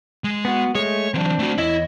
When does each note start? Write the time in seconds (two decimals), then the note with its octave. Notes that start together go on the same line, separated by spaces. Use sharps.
0.24 G#3
0.45 B3 F#4
0.75 G#3 A3 C#5
1.14 E3 F#3 C4 D4
1.39 A3 F#4
1.58 E2 E4 C#5 D#5